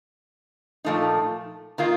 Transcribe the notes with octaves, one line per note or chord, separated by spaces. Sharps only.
A#2 F3 A3 D#4
D#3 A#3 F4